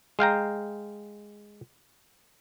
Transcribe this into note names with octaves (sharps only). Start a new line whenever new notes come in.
G#3 F5 G5 A#5